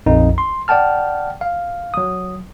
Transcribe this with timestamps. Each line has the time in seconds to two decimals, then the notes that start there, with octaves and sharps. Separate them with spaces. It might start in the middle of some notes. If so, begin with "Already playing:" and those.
0.06 A#1 F2 D#4
0.38 C6
0.68 D5 F#5 G5 A5 F6
1.41 F5
1.94 F#3 D#6